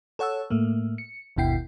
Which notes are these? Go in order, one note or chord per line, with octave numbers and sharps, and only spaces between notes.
A4 C#5 F#5 A5 E6
A2 A3 A#3
C#7
G1 D#2 B2 E4 G5 C7